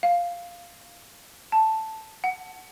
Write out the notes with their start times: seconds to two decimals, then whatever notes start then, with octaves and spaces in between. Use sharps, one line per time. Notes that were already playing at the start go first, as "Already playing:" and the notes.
0.03 F5
1.52 A5
2.24 F#5